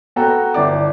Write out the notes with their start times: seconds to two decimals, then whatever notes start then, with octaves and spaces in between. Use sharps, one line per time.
0.16 B3 F#4 A4 G5 A#5
0.54 G1 E4 D5 D6